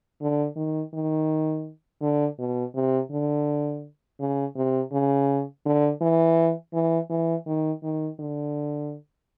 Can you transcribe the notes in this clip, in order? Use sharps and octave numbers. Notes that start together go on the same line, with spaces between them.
D3
D#3
D#3
D3
B2
C3
D3
C#3
C3
C#3
D3
E3
E3
E3
D#3
D#3
D3